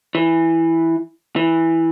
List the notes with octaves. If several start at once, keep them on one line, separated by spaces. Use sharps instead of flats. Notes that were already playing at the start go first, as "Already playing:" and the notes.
E3
E3